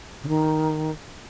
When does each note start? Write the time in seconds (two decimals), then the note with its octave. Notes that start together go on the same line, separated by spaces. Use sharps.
0.23 C#3
0.28 D#3